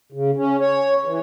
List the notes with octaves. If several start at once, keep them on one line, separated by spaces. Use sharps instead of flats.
C#3
C#4
C#5
E3